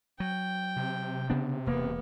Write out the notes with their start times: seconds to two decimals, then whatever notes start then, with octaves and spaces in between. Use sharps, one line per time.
0.20 F#3 G5
0.76 C3
1.30 C#3 B3 D4
1.67 E1 A#3 B3